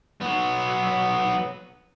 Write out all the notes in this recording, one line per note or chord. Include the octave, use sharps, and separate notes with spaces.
F#3 B3